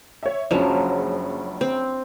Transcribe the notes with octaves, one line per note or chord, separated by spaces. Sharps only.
C#5 E5
F#1 F3 F#3 G#3 C#4 D4
C4